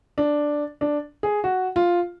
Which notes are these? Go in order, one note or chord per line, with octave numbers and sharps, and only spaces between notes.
D4
D4
G#4
F#4
F4